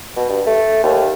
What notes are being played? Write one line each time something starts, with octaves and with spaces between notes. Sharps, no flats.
B2
G2
A3
D#2